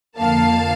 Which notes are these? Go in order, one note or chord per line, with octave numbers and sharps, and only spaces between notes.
F2 D3 F3 A#3 F5 A5